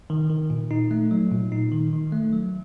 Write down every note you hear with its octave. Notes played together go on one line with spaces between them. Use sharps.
D#3
D#3
A#2
D#4
A3
F#3
A#2
D#4
D#3
D#3
A3
F#3